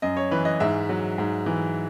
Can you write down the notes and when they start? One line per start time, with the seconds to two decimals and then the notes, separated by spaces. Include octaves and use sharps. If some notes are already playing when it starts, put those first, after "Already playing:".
0.02 F#2 D#5
0.17 C#5
0.31 E3 B4
0.45 D#5
0.60 G#2 E5
0.89 F#3
1.18 G#2
1.46 E3